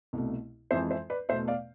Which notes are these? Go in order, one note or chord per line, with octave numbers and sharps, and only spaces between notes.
C2 B2 A3
F2 E3 G#3 C5 E5
C5 E5
B4 D5
E2 B2 A3 C5 E5
D5 F5